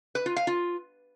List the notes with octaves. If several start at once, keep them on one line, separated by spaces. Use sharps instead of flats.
B4
F4
F5
F4